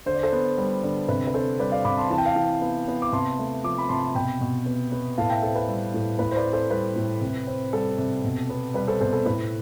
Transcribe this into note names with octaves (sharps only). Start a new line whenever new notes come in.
D3 C5
D5
A4 C5
B3
G3
D3
C3 B4
B4
C4 A4 C5
G3 B4 D5
D5 F5
C3 B5 D6
A5 C6
E3 A5
G5
F5 A5
E3
B3
B3
D6
C3 A5 C6
A3
F3 D6
B5 D6
C3 A5 C6
B2 G5 B5
B2
B3
B3
A2 F5 A5
E5 G5
C4 A4
B4
G3
A2
A2 B4
C5
B4 D5
C4
A4 C5
G3 B4
A2
C3
C4
G3 A4
C3
B2
B3
G3 B4
A4 C5
B2 A4 C5
A4
A2 B4